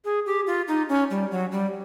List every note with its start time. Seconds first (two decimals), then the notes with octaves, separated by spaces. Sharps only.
0.05 G#4
0.26 G4
0.47 F4
0.68 D#4
0.89 C#4
1.10 G3
1.31 F#3
1.52 G3